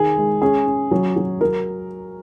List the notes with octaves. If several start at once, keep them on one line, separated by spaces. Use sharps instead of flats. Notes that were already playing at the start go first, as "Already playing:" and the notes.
Already playing: D#3 G#4
G#3
C#4 G#4
C#4
F#3
F#3
F#3 A#4